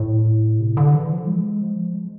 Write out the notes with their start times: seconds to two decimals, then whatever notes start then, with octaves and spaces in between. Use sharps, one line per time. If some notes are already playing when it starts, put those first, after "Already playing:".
Already playing: A2
0.60 C3
0.77 D3
0.95 E3
1.11 F3
1.27 G#3
1.61 F3
1.94 G#3